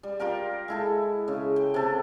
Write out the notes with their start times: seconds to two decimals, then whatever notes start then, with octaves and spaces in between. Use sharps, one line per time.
0.03 G3
0.19 F4 G4 A#4 G5
0.68 G#3 E4 A4
1.28 C#3
1.56 G5
1.74 C3 A4